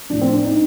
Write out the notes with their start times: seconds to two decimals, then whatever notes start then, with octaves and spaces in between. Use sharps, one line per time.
0.10 A2 F3 D4
0.21 C4
0.33 D4
0.45 D#4